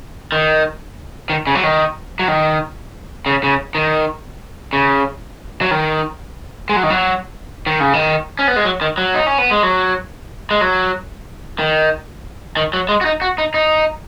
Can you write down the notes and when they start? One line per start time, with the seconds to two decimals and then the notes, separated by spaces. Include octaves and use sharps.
0.32 D#3
1.30 D#3
1.47 C#3
1.55 F#3
1.63 D#3
2.19 F#3
2.28 D#3
3.26 C#3
3.44 C#3
3.75 D#3
4.73 C#3
5.61 F#3
5.71 D#3
6.69 G#3
6.76 F#3
6.83 D#3
6.90 F#3
7.67 D#3
7.80 C#3
7.93 D#3
8.39 C#4
8.48 B3
8.56 G#3
8.65 F#3
8.81 D#3
8.98 F#3
9.15 D#4
9.26 C#4
9.38 B3
9.51 G#3
9.63 F#3
10.51 G#3
10.61 F#3
11.59 D#3
12.57 D#3
12.73 F#3
12.89 G#3
13.01 F#4
13.05 D#4
13.22 F#4
13.38 D#4
13.54 D#4